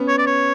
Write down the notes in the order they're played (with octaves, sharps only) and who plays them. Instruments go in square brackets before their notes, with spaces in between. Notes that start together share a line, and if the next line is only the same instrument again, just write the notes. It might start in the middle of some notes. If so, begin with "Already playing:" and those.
Already playing: [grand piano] B3 C#4
[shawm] C#5
D5
C#5